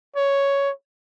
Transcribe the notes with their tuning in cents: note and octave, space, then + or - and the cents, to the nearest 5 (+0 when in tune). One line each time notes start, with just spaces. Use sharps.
C#5 +5